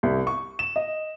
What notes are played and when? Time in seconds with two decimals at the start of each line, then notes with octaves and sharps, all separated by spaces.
0.03 C2
0.27 C#6
0.59 E7
0.76 D#5